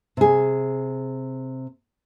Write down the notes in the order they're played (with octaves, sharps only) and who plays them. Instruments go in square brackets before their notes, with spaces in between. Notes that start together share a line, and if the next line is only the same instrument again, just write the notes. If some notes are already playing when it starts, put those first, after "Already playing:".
[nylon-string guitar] C3 G#4